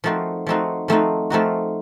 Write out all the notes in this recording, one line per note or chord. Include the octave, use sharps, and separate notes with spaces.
F3 A3 C4 D#4 F#4
F3 A3 C4 D#4 F#4
F3 A3 C4 D#4 F#4
F3 A3 C4 D#4 F#4